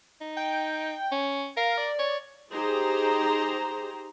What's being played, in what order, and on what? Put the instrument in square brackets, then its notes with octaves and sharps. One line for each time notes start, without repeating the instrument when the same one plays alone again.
[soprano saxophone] D#4
[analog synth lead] G5
[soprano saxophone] C#4
[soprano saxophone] A#4 [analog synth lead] F5
[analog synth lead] D5
[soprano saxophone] C#5
[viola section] D#4 G4 G#4 C5 A#5